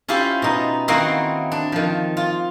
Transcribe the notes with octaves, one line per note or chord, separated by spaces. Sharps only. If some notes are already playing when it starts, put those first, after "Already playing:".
C#4 E4 F4 G4 C5
B2 D#4
D#3 A#3 C4 D#4 E4 F#4
D4
D#3 F3
F4